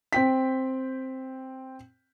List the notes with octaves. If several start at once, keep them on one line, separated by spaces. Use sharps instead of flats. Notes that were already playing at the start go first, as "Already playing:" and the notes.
C4 G5 B6